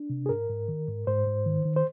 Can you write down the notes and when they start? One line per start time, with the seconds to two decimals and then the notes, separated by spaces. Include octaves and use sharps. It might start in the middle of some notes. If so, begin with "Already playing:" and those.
Already playing: D4
0.10 C3
0.26 G#4
0.29 G#2 A#4
0.49 G#2
0.68 D#3
0.88 G#2
1.07 G#2 C5
1.27 G#2
1.46 D#3
1.65 D#3
1.76 C5